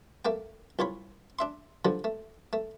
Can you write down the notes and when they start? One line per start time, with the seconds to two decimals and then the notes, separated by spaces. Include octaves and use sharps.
0.25 A3 A#3 G5
0.79 C2 F4 C#5 B5
1.39 D4 E5 C6
1.85 D3 F3 G3
2.04 A3
2.53 A3